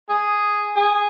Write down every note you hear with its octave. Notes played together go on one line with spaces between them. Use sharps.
G#4
G#4